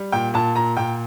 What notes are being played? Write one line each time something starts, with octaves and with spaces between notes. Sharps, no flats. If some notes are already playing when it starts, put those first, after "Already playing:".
Already playing: G3
A#2 G5
A#2 A5
A#2 A#5
A#2 G5